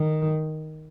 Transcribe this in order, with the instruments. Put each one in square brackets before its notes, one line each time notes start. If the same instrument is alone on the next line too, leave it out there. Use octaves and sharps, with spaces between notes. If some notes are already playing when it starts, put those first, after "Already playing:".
Already playing: [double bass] D#3